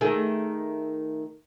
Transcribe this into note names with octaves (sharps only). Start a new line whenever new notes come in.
D#3 A3 G#4